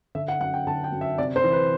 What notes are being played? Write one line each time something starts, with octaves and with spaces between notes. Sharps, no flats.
D3 E5
F#5
F#2 F#5
G5
D3 A5
G5
F#2
E5
C3 D5
C5
E3
B4